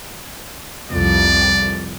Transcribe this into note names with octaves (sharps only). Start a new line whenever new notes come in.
C2 F2 D5